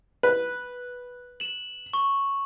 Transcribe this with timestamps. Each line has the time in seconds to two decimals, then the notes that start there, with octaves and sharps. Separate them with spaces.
0.23 B4
1.40 E7 F#7
1.93 C#6